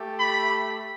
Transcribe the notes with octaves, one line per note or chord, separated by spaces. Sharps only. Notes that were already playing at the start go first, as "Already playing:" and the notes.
Already playing: A3 G4
B5